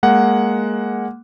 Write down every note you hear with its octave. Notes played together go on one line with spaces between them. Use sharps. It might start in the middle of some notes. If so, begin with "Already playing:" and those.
G#3 A#3 F#5